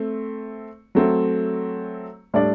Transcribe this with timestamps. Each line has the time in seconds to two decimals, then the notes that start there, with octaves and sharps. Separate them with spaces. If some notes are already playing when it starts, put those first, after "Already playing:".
Already playing: A3 C4
0.95 F#3 A3 C4
2.34 A2 G3 D4 A4 D5